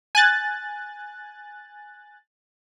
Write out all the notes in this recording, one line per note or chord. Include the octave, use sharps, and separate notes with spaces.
G#5 F#6 A6